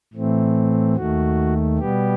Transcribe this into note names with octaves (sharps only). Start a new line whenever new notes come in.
A2 E3 A3 C4
D#2 D#3 A3 F#4
B2 G3 B3 G4